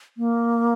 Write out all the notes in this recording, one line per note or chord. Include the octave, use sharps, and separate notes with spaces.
A#3